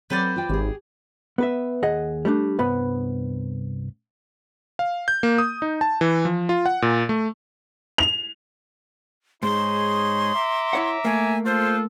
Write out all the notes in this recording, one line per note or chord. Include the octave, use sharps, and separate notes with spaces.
F#3 C4 A4 B4 C5 D5
F4 G5
G#1 G4 G#4
B3 B4 E5
D#2 G#4 D#5 F#5
G3 A3 C4 D4
C2 G2 B3 B5
F5
G6
A#3
D#6
D#4
A5
E3
F3
F4
F#5
A#2
A3
F7
G#2 D#4 G#4 C#5 C6
E5 A#5 D6
E4 C#5 F#5
A3 A#3 G#5
F4 A4 C5